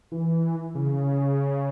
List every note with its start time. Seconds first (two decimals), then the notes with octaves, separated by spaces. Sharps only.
0.12 E3
0.75 C#3